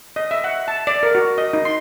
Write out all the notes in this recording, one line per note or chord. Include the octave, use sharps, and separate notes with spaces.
D#5
E5
F#5
A5
D5
A#4
F#4
D#5
D#4
C6